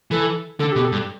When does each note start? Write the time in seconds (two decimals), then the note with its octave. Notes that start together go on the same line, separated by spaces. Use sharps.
0.11 E3 A4
0.59 D3 A4
0.72 B2 G4
0.85 A4
0.92 G2